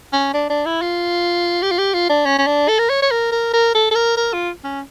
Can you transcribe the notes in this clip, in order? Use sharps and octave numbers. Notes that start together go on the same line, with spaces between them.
C#4
D4
D4
E4
F4
G4
F4
G4
F4
D4
C#4
C#4
D4
A4
A#4
C#5
C#5
A#4
A#4
A#4
A4
A4
A#4
A#4
F4
C#4